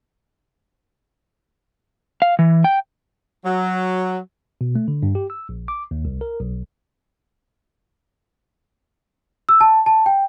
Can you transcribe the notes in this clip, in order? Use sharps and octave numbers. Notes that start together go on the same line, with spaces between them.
F5
E3
G5
F#3
B2
A3
D3
G2
G4
E6
A#1
D6
D#2
C2
A#4
B1
E6
A5
A5
G5